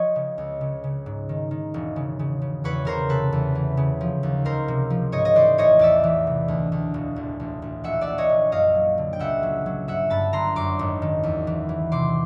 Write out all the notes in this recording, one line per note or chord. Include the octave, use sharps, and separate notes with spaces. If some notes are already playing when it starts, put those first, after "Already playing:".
Already playing: F3 C#5 D#5
C#3
C#2
C#3
C#3
G#2
D#3
D#3
E1
C#3
C#3
C#3
E2 B4 C#5
C#3 A#4 C5
C3 A4 B4
E2
E3
C#3
F3
D#2
C#2 A#4 C5
C3
F3
G#2 C#5 D#5
D#5
E3 C5 D5
A1 C#5 D#5
E2 D5 E5
E3
C3
D2
D2
E1
A1
A1
A1
A#1 E5 F#5
D5 E5
A#1
C#5 D#5
A#1
F#2 D#5 F5
F#3
D3
G5
C#2 E5 F#5
F#3
F#3
G1 E5 F#5
G2 A5 B5
G1 A#5 C6
F#2 C6 D6
G#1
D#3
E2
E3
E3
C3 C6 D6